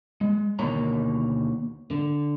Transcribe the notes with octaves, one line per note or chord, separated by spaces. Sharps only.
G#3
D2 B2 D#3 A#3 C#5 A#5
D3